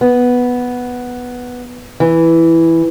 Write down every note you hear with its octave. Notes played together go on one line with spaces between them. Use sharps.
B3
E3